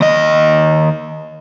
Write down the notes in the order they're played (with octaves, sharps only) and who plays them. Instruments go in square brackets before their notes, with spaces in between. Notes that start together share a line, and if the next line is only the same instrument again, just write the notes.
[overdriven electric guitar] D#2 D#5